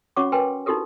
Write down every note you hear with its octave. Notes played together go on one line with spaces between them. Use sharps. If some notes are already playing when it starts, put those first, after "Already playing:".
C#4 F#4 C#5 F#5 C#6 D6
A#4 B4 G5 G#5 C6
D#4 E4 F#4 G4 A4 A#4